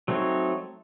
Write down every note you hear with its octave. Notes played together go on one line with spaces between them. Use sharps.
F#3 A3 C4 D#4 C#5